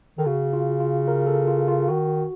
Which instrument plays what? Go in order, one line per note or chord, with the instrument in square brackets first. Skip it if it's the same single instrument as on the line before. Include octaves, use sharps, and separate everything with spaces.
[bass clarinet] D#3 [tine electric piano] A4
[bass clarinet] C#3 [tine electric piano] F#4
[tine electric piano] F4
F4
A#4
A4
F4
F4
[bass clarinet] D#3 [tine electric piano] F#4